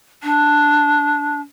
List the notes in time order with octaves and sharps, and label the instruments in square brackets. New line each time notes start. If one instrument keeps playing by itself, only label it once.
[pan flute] D4